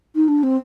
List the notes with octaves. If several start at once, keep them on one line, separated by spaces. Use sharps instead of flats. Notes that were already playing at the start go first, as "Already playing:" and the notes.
D#4
D4
C4